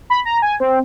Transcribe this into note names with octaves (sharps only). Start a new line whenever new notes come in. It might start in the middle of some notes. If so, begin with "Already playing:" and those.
B5
A#5
G#5
C4